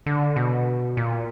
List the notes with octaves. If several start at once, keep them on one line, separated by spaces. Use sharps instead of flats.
D3
B2
A#2